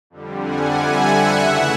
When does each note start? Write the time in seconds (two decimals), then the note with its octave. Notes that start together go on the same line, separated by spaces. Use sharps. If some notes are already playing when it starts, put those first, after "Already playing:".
0.10 F2 D3 G3
0.42 F#5 G#5
0.74 E5 F#5
1.39 C#3 E3 A3 E5 F#5